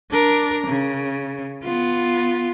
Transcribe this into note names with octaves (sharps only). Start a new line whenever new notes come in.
D4 A#4
C#3
B3 F4